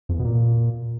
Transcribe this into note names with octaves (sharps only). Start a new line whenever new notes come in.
F2
E2
B2
A#2